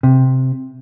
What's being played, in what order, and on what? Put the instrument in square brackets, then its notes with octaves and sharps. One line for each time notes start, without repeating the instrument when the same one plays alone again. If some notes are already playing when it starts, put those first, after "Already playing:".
[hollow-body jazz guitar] C3